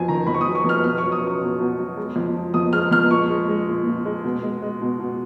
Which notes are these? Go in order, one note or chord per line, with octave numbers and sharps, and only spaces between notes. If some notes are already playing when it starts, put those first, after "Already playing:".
Already playing: F2 F#3 G#5
D#3 A#5
F2 B5
C#6
D#6
F#3
C#6
F2 F6
B2 F6
C#6
F#3
D#6
F#3 C#6
B2
B2
F#3
G#3
F2
F3
F2 D#6
G#3 F6
F2 F6
A#2 C#6
G#3
G#3
A#2
A#2
G#3
B2
G#3
G#3
B2
B2